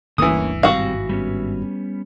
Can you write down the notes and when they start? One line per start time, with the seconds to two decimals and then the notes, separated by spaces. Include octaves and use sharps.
0.18 G1 D2 D3 E3 A#3 C#4 D#6
0.63 G#1 G2 B2 G3 C4 F#4 G4 F5
1.09 G3 B3 C#4